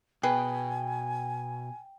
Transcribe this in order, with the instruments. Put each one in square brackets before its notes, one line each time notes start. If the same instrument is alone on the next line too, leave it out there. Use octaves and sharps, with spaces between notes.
[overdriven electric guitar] B2 [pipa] G#4 B4 [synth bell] G5 [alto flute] G#5